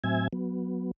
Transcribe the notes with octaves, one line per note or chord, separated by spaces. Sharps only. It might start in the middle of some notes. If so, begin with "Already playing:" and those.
A2 F#3 C4 E5 G#5 G#6
F#3 B3